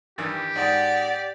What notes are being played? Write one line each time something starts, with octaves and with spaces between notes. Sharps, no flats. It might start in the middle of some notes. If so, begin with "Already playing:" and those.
G2 D#3 E3 G4
G#2 G#3 D5 F#5